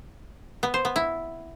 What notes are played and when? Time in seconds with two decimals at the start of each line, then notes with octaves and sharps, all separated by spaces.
0.63 B3
0.74 C5
0.85 B3
0.96 E4